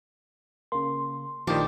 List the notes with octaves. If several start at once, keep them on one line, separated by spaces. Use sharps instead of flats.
C#3 A#3 C6
A#1 A2 D#3 F3 D4 G4